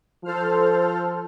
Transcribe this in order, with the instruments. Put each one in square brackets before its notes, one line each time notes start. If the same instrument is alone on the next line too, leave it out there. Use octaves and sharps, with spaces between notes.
[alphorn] F3 [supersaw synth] A4 C5 F6